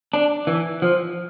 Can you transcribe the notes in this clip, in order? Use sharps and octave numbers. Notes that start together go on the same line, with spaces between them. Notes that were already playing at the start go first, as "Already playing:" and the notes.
D4
E3
F3